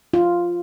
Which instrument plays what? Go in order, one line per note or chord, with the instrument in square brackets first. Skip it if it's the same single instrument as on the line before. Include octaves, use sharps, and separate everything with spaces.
[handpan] F4